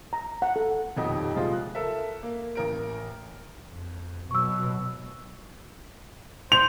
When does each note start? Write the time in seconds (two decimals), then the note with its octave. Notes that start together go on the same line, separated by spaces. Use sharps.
0.13 A#5
0.42 F#5
0.56 A4
0.96 D#1 F2 B2 D#4 G4
1.34 C3 F3 G3 G#3 F4
1.53 F#6
1.75 A4 A#4 E5
2.23 A#3
2.55 A1 A#4 D7
3.68 F2
4.31 B2 F#3 C#6 E6
6.52 C5 F7